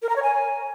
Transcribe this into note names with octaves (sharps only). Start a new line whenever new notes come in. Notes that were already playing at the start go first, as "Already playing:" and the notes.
A#4
A#5
C#5
G#5